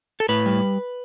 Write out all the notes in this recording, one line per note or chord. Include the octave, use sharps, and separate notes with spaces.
A4
A2 B4
G3